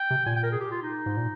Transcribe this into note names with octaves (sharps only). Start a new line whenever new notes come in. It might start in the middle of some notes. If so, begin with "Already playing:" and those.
Already playing: G5
C3
A#2 G#5
G5
A#4
G#4
G4
F4
D#4
G#2
A#2